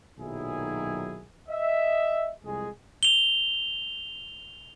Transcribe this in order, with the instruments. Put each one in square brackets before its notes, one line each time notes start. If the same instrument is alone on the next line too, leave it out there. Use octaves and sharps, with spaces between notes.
[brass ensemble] B1 A#2 D#3 F#3 E4 G#4
D#5 E5
C2 F2 G#3 G#4
[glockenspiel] F7 G7